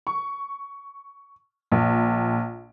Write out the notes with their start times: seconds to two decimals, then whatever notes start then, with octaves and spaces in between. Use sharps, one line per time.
0.07 C#6
1.72 A#1